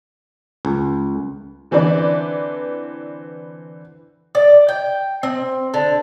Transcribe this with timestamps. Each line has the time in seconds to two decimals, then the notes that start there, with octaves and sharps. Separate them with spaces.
0.65 C#2
1.71 D3 E3 C4 B4 D5
4.35 D5
4.69 G5
5.23 C4
5.74 D3